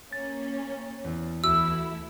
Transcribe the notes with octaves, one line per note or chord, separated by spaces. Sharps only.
A#3 C#4 A6
E2
D2 E3 A3 E4 F#4 E6